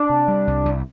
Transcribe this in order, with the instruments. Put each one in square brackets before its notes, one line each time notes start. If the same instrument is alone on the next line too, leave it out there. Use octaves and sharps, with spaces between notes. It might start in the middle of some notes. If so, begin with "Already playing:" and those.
Already playing: [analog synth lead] D4
[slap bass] C3
G3
C2
C2